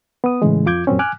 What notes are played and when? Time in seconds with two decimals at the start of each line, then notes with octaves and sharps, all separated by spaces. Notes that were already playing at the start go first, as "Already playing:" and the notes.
0.24 B3 D#6
0.42 A2 C#3 E3 G#3
0.66 F2 F4 D6 G6 G#6
0.87 F#2 A#2 C4 C#4
0.99 G#5 D6 F6 F#6